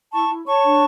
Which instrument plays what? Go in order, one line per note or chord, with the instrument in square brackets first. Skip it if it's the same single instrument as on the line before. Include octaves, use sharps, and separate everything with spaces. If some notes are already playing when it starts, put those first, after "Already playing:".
[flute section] E4 A5 C#6
E4
C#5 A5 C#6
D4